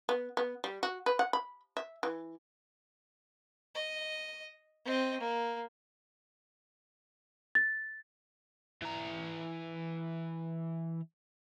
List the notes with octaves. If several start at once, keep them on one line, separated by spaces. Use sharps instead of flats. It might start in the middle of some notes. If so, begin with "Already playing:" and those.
B3
B3
G3
F#4
B4
F#5
B5
E5
E3
D#5
C4 D#5
A#3
A6
E3 A#5